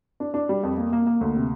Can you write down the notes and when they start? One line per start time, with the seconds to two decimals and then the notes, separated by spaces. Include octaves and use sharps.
0.20 D4
0.34 D4
0.49 G3
0.63 F2
0.78 A#3
0.93 A#3
1.07 A#3
1.21 D2
1.36 C3